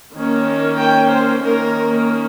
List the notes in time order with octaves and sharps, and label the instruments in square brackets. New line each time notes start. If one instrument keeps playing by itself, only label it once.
[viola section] D#3 A#3 C#4
G5
C5
D#3 A#3 C#4 A#4